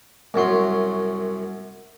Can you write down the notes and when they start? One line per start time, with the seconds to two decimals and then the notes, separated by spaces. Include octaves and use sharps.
0.34 C2 F#2 F#3 C6